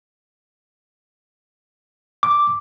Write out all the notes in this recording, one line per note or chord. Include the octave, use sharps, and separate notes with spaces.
D6